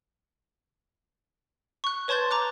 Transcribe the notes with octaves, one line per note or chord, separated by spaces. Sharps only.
C#6 F#6
B4 C#5 A5 C6 G6 A6
A#5 D6 F#6